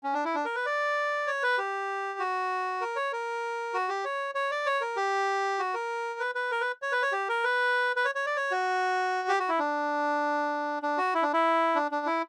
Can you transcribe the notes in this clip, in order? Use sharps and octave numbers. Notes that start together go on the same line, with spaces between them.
C#4
D4
E4
D4
A#4
B4
D5
C#5
B4
G4
F#4
A#4
C#5
A#4
F#4
G4
C#5
C#5
D5
C#5
A#4
G4
F#4
A#4
B4
B4
A#4
B4
C#5
B4
C#5
G4
A#4
B4
B4
C#5
C#5
D5
C#5
F#4
G4
F#4
E4
D4
D4
F#4
E4
D4
E4
D4
D4
E4